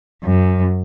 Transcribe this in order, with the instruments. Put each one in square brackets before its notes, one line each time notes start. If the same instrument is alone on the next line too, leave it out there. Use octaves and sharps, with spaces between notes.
[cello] F#2